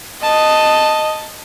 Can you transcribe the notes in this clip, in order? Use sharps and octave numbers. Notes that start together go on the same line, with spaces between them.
D#5 A5